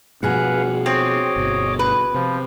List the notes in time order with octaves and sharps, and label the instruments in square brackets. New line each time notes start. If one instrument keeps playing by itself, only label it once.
[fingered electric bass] B2 F3 [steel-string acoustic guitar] F#4 G#4 [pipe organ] B4 F5 F#5
[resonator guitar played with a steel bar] C4 [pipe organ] C#5 D#5 D6
[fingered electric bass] G1 B2
[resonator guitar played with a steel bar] B4
[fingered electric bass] C3 [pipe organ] F3